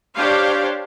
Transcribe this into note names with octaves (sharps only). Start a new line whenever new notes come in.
D4 G4 C5 C#5 F5